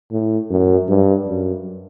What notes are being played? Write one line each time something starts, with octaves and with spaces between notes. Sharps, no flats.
A2
F#2
G2
F#2